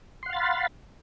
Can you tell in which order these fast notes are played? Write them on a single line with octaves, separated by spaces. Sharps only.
C6 F#5 F5 A6 B5